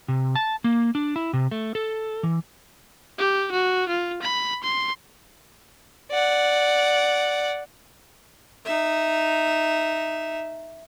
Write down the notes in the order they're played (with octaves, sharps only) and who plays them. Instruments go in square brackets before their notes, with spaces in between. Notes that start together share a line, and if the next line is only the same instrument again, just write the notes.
[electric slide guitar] C3
A5
A#3
D4
E4
C3
A3
A4
E3
[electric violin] G4
F#4
F4
B5
C6
[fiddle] D5 F#5
[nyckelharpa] D#4 E5